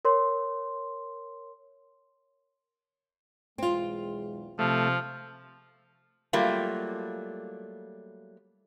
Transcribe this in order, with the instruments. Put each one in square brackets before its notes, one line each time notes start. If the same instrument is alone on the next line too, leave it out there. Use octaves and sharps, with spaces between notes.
[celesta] A#4 C#5 C6
[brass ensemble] B1 E2 G#3 [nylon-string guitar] C4 F4
[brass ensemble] C3 [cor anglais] F3 [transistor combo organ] A3
[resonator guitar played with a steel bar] F#3 G3 A3 A#3 F4